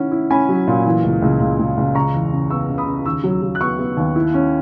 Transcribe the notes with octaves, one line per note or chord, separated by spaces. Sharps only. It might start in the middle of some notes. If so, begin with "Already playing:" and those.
Already playing: D#3 C#4 E4 F#5
E4
C#4 G#5 B5
F#3
A#2
E3
C#2
C#2
C#2
C#2
C#2
C#3 A#5 C#6
E2
C#3
B3 C#6 E6
C#3
B5 D#6
C#3
D#2 C#6 E6
F#3
F#3
F#6
B3 C#6 E6
B3
D#2
E4
C#4